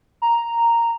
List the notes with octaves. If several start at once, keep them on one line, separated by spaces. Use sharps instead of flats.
A#5